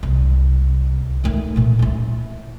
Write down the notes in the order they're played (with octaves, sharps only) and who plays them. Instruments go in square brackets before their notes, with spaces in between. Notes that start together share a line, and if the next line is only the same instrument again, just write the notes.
[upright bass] C2
D#3 A3
A#2 A3
E4 F4